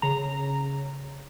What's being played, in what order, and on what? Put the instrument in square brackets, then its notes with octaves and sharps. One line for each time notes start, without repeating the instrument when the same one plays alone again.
[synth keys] C#3 A#5